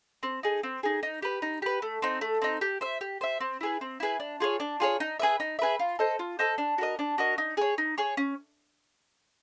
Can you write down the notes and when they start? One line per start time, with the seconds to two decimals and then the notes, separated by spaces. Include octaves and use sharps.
0.23 C4
0.43 D#4 G#4
0.63 C4
0.83 D#4 G#4
1.03 D#4
1.22 G4 B4
1.42 D#4
1.62 G4 B4
1.82 A3
2.02 C4 D#4
2.21 A3
2.42 C4 D#4
2.61 G4
2.81 C5 E5
3.01 G4
3.21 C5 E5
3.40 C4
3.61 E4 G#4 B4
3.81 C4
4.00 E4 G#4 B4
4.20 D4
4.40 F4 G#4 C#5
4.60 D4
4.80 F4 G#4 C#5
5.00 D#4
5.20 G#4 B4 E5
5.40 D#4
5.59 G#4 B4 E5
5.79 F4
5.99 A4 C5 D#5
6.19 F4
6.39 A4 C5 D#5
6.58 D4
6.78 F#4 A#4 D#5
6.99 D4
7.18 F#4 A#4 D#5
7.38 D#4
7.57 G#4 C#5
7.78 D#4
7.98 G#4 C#5
8.17 C#4